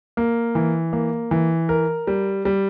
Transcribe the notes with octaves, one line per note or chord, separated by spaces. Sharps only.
A#3
E3
A#3
E3
A#4
G3
G3